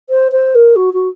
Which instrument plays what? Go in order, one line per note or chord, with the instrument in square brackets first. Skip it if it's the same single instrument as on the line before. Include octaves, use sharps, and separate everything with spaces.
[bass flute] C5
C5
A#4
F#4
F#4